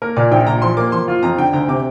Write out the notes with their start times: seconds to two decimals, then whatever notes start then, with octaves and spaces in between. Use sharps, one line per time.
0.02 A#3 A#4
0.17 A#2 D5
0.32 A#1 G5
0.47 A#2 A#5
0.62 F3 C6
0.77 A#3 D6
0.92 F3 C6
1.08 F4
1.23 F2 A#5
1.38 D3 G5
1.53 D2 A#5
1.68 C3 D6